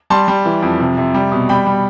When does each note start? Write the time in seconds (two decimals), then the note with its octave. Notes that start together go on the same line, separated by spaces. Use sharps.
0.10 G3 A5 C6
0.28 G3
0.46 E3
0.62 F2
0.80 C3
0.97 C3
1.14 G3
1.32 B2
1.49 G3 G5 B5
1.66 G3